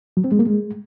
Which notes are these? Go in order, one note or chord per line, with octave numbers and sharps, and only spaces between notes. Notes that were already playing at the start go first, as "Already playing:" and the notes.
F#3
C4
G#3
A#3
G#3